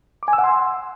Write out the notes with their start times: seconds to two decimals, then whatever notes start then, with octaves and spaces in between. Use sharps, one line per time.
0.23 D6
0.28 G#5
0.33 E6
0.38 F#5
0.44 C6